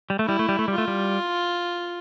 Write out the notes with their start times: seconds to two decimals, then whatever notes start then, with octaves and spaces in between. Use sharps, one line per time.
0.10 G3
0.19 A3
0.25 G3 E4
0.39 A3
0.49 G3
0.59 A3
0.68 G3
0.73 A3 F4
0.88 G3